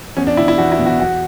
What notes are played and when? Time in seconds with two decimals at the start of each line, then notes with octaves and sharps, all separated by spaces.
0.17 E2 C#4
0.27 D4
0.37 B2 E4
0.48 E4
0.58 E2 F#4
0.72 E4
0.79 B2
0.86 F#4
1.00 E2 F#4